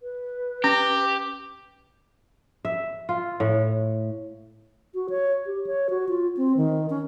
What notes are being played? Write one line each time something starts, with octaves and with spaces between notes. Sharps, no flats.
B4
C#4 G4
E5
F4
A2
F#4
C#5
G4
C#5
F#4
F4
C4
D#3
C#4